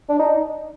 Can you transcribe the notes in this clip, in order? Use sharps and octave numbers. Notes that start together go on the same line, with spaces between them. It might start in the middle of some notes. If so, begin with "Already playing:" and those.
D4
D#4